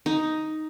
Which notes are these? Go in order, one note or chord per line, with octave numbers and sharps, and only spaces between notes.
D#4